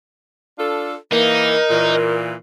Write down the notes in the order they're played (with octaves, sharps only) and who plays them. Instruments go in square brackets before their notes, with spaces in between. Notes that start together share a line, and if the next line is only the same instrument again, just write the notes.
[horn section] D4 F4 A4
[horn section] E3 A#3 [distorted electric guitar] D#4 [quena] A#4
[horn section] A#2 E3